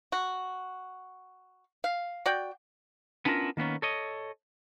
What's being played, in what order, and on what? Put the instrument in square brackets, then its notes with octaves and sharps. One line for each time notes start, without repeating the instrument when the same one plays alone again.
[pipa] F#4
F5
F#4 D5 G5
[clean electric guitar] B3 C#4 D4 E4 F4 A#4
D#3 A#3 B3 C#4
A4 C#5 D#5